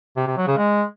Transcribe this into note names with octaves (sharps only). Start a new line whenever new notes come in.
C3
C3
F#3
C#3
G#3